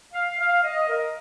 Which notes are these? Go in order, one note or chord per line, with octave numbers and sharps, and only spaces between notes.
F5
F5
D#5
A#4